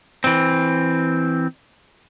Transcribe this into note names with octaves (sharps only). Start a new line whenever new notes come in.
E3 C4